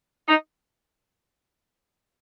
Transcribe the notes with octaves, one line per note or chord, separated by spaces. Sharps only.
D#4